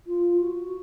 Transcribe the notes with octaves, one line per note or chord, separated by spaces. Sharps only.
F4
F#4